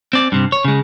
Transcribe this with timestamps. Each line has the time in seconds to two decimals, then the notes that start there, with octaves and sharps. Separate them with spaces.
0.13 C4 D5
0.32 G2 C3
0.52 C#5
0.65 C#3 G#3